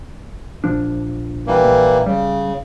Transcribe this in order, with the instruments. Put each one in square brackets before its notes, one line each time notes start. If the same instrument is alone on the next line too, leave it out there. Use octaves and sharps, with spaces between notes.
[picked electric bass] A#1 F3 D4
[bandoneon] E3 G3 A#3
[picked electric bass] A#1
[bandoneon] C#3 [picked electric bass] G3